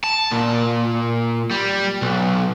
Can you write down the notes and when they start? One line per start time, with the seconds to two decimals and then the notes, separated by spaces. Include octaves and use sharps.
0.04 A5
0.31 A#2
1.51 G3
2.02 B1